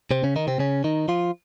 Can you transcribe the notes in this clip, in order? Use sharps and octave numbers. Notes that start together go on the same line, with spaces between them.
C3 C4
C#3 C#4
D#3 D#4
C3 C4
C#3 C#4
D#3 D#4
F3 F4